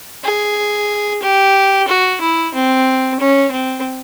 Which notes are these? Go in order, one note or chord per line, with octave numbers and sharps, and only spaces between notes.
G#4
G4
F#4
E4
C4
C#4
C4